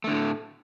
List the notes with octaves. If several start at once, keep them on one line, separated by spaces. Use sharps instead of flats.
A2 D3 A3